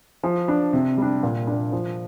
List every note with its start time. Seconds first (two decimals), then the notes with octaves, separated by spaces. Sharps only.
0.23 F3
0.48 D4
0.73 C3
0.98 G3 D4
1.23 A#2
1.47 A#3 D4
1.72 F3